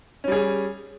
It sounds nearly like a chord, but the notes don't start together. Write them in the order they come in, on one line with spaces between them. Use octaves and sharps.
C#4 G3 G#4